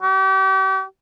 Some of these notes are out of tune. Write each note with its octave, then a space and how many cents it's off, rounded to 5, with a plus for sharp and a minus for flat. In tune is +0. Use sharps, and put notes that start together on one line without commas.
G4 -40